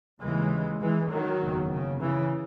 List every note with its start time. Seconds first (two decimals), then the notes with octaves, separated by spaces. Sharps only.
0.21 D#2 C#3 E3 G#3
0.81 E3 G#3
1.10 D#3 F#3
1.41 F#1 E2 C#3
1.71 C#3
2.00 C#3 E3